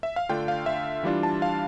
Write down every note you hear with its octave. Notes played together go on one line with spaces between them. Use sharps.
E5
F5
D3 A3 D4 F4 G5
F5
E5
E3 G3 D4 F4
A5
F5